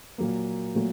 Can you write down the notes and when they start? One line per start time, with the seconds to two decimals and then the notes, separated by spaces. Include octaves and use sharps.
0.18 A#2 F#3 A#3
0.75 A#2 F#3 A3